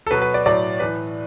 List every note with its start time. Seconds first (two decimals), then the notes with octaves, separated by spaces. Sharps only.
0.07 A4
0.11 B2 F#3 B4
0.22 B4
0.34 D5
0.46 A2 F#3 D5
0.80 A2 E3 B4